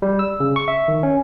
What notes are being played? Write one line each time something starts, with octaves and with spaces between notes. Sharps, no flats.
G3
E6
C#3
C#6
E5
D#3
C#4